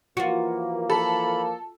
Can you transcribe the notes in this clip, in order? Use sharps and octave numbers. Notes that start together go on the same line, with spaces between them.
E3 F3 A#3 F4 F#4
A4 B5